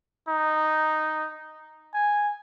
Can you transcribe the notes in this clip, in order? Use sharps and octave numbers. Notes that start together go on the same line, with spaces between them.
D#4
G#5